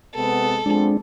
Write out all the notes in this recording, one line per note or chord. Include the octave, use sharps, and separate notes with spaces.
C3 G#3 B3 A4
F3 G#3 B3 C4 D4